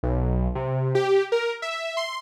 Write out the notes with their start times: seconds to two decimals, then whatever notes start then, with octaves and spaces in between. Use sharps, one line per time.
0.03 B1
0.55 C3
0.95 G4
1.32 A#4
1.62 E5
1.97 C6